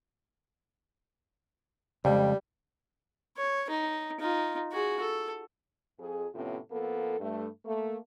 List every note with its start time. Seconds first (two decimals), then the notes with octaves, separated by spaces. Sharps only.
2.05 F2 C#3 G3 G#3
3.37 C#5
3.70 D#4
4.20 D#4 F4
4.72 F#4 G#4
5.01 A4
5.99 F2 G#4
6.35 F2 A2 C3 B3 C#4 F4
6.71 F2 A#3 B3 A4
7.20 G2 A3
7.65 A3 A#3